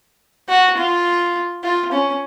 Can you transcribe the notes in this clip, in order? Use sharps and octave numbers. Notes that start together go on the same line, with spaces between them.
F#4
F4
F4
C#4